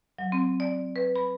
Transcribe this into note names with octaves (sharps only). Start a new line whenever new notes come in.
F#3
C4
D5
B4
B5